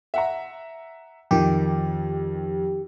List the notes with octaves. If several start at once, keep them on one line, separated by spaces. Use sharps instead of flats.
E5 F#5 A#5
F2 D#3 G4